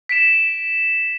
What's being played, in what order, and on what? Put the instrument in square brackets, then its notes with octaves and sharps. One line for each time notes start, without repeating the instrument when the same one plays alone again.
[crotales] B6 D7 E7